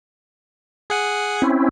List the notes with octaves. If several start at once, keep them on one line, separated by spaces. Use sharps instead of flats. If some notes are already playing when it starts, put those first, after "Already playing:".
G#4 F#5 G#5
C4 C#4 E4